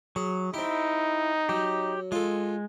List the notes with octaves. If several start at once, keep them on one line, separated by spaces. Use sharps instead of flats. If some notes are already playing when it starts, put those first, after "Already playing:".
F#3 G#4
C4 D#4 E4 G4
F#3 G4
G#3 F4 A4